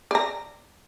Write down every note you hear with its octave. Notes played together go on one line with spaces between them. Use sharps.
D5 A#5